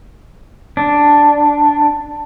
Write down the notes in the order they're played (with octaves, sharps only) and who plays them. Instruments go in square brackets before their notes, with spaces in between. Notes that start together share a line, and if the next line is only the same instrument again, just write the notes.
[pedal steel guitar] D4